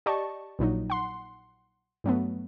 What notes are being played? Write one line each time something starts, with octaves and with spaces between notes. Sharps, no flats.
G4 D5 D#5 A5 C#6
A#1 A#2 F#3 D#4
F#5 C6
G2 F#3 A3 B3